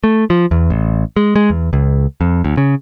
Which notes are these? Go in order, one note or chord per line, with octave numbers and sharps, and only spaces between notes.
A3
F3
E2
A1
G#3
G#3
E2
C#2
F2
D2
C#3